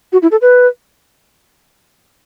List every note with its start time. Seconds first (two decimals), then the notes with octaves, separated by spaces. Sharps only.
0.13 F#4
0.22 E4
0.31 A4
0.42 B4